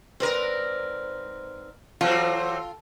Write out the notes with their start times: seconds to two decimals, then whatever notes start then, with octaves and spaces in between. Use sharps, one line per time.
0.20 G#2 C4 A#4 B4 D5
2.01 E3 F#3 C4 F4 A4 G5